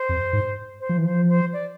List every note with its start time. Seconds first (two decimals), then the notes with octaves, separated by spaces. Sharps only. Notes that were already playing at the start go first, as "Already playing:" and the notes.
Already playing: C5
0.09 F2
0.33 G#2
0.80 C5
0.89 F3
0.98 E3
1.04 F3 C5
1.28 C5
1.53 D5